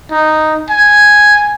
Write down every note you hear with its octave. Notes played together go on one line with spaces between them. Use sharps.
D#4
G#5